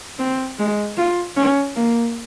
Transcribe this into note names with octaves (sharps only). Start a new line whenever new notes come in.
C4
G#3
F4
C#4
A#3